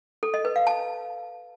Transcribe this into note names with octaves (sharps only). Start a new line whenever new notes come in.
A4
D#5
B4
F5
A5